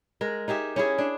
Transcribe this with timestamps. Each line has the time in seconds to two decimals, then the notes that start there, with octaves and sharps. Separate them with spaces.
0.21 G#3 A#4
0.48 D#4 G4 G#4 E5
0.76 C#4 E4 G#4
0.98 D4